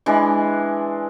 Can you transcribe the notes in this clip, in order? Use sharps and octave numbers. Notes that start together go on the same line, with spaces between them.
E3 G#3 D4